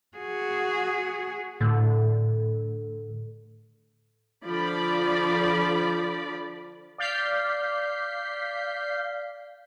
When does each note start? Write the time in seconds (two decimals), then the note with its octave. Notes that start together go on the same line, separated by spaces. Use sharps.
0.17 F#4 G#4
1.61 A2 D3
4.45 D3 F3 D5 B5
6.98 D5 F5 G6 B6 C7